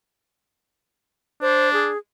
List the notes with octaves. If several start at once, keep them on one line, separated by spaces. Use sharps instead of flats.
D4 C5
G#4